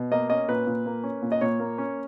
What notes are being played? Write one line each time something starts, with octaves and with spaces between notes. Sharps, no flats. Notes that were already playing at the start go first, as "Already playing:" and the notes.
Already playing: B2
A#3 D#5
C#4 D#5
A#2 B4
A#2
A#3
C#4
A#2
D#5
A#2 C#5
A#3
C#4